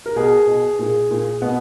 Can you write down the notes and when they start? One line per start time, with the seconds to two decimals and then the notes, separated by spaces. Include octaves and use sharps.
0.06 A#4
0.16 B2 G#4
0.48 B2
0.79 A#2 G#4
1.11 A#2
1.42 B2 B3